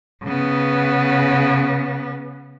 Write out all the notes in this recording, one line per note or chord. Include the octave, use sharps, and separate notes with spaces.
C#3 B3